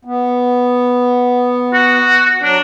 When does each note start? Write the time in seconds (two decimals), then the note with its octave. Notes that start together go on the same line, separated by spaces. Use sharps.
0.05 B3
1.73 F#4
2.42 F#3 D4